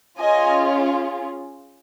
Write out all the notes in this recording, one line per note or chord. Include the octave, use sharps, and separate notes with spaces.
C#4 F4 G#4 D#5 G#5